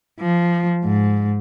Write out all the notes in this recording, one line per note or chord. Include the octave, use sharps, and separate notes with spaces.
F3
G#2